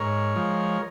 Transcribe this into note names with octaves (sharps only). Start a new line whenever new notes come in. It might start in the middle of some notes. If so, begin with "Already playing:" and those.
Already playing: G#2 A#4 C#5
F3 G#3